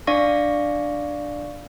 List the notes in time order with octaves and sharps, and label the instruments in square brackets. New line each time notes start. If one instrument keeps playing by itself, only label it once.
[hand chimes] D4 D5 F5 C#6 A#6